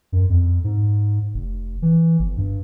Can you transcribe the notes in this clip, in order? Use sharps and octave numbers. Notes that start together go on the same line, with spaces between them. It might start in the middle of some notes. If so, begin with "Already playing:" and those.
F#2
F2
G#2
F1
E3
G1
G2